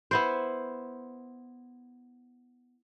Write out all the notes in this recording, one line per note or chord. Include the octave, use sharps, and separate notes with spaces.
B3 E4 C5